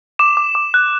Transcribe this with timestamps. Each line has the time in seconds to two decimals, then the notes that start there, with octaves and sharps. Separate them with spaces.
0.19 D6 E7
0.37 D6
0.55 D6
0.74 F#6